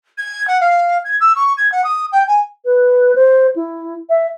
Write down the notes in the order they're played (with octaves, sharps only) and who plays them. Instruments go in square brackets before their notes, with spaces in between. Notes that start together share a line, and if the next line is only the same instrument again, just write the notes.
[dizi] G#6
F#5
F5
G#6
E6
C#6
G#6
F#5
D#6
G5
G#5
[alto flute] B4
C5
E4
E5